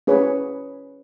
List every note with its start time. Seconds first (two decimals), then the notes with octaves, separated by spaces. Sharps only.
0.07 C#4 G#4 B4 C#5